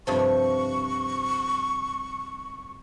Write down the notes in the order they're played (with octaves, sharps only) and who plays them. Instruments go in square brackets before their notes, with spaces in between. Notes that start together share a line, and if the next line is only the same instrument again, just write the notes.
[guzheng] G2 C3 F3 [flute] C#6